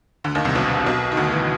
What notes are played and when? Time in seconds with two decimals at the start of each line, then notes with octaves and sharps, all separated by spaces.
0.24 D2 D3
0.35 D#2 D#3
0.45 C2 C3
0.55 B1 B2
0.86 B1 B2
1.12 D#3
1.17 D2 D3
1.32 E3